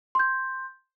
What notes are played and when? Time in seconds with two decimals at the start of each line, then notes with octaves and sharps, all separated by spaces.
0.15 C6 G6